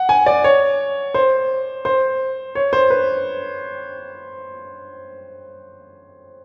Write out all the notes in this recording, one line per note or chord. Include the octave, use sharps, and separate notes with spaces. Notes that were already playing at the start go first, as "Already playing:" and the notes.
Already playing: F#5
G#5
D5
C#5
C5
C5
C#5
C5
B4